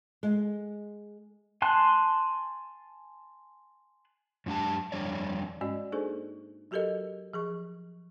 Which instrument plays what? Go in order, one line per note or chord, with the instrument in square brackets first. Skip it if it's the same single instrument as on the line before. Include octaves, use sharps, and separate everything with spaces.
[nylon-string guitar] G#3
[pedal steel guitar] G#5 A5 C6 F#6
[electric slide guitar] F#2 G#3 D4 F4 G4 A5
F2 G3 D4 C#5 D5
[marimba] G#2 G#3 C#4 F#4 D5 D#5
A#3 D4 D#4 G#4 A4 C5
F#3 F#4 G4 A4 A#4 D#5
F3 G#4 C#6